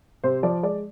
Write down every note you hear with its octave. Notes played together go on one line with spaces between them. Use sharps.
C3 C5
F3 D5
G#3 D5